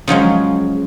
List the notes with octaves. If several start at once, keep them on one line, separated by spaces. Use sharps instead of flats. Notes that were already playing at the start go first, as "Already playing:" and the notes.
C#3 F3 F#3 G#3